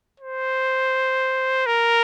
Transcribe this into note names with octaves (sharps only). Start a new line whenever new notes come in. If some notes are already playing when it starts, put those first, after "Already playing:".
C5
A#4